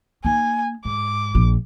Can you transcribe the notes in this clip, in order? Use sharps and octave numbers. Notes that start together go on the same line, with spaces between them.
A#3 D#4 G#5
G#2 D6
A#1 F3